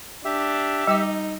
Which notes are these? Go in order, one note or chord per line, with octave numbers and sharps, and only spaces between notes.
D4 G4 E5
G3 D#4 G5 D6